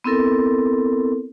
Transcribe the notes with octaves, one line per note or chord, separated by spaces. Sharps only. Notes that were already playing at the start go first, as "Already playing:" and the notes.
B3 C4 E4 A4 A#4